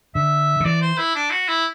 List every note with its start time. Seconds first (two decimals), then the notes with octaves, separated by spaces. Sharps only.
0.15 D3 E5
0.60 D3
0.64 E3 D5
0.81 C5
0.98 E4
1.15 D4
1.31 F#4
1.48 E4